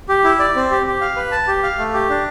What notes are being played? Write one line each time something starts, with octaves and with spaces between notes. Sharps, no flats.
G4
E4
D5
C4
G4
G4
F5
B4
A5
G4
F5
A3
G4
D4